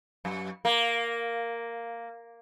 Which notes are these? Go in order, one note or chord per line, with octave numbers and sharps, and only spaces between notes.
F#2
A#3